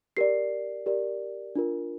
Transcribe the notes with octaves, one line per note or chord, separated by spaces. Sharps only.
G4 A#4 D5 C7
G4 A#4 D5
D4 F4 A#4